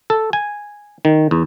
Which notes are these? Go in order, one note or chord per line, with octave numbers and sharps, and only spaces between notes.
A4
G#5
D#3
E2